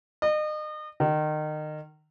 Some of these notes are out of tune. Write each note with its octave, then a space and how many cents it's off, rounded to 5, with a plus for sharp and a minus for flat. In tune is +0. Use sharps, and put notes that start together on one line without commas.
D#5 -35
D#3 -25